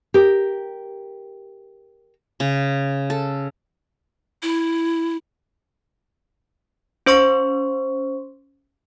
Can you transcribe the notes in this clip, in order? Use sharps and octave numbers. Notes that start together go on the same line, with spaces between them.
G4 A#4
C#3
A4
E4
C#4 C5 C6 C#6